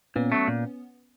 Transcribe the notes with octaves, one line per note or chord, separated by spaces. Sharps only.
A#2 B3 C#4
F#3 A3
A#2